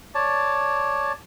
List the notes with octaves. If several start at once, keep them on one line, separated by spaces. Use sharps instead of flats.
C#5 D5 A5